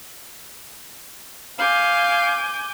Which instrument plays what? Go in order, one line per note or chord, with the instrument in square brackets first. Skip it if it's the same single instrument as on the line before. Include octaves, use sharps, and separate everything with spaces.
[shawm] F5 [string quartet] G#5 D6 G6